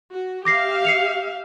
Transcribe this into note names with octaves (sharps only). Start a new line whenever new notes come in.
F#4
G4 E5 F5 D6 A#6 C7
C7 C#7 F7